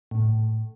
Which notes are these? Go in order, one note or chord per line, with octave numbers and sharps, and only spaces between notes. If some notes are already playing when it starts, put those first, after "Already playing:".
A2